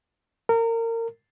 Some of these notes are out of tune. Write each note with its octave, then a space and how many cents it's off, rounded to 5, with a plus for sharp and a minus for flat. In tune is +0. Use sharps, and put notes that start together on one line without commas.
A#4 -30